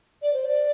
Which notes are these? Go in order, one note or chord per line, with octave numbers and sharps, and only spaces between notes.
D5
C5
D5